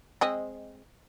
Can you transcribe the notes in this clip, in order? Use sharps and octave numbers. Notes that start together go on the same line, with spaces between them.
G#3 C4 D#5